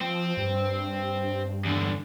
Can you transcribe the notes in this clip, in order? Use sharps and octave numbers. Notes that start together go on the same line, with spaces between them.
F3 C4
G2
E2 D3